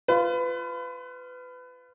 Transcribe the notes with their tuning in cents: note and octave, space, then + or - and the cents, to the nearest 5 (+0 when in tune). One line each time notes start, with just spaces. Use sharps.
F4 -10 B4 +25